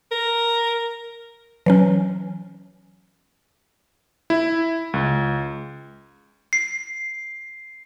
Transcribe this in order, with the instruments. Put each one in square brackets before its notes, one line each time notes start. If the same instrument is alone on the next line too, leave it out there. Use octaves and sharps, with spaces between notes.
[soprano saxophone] A#4
[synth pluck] E3 F#3 C#4
[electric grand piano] E4
C#2
[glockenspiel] C7